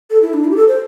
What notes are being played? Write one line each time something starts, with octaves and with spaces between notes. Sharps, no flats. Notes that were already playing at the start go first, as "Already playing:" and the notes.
A4
E4
D4
E4
G4
A4
C5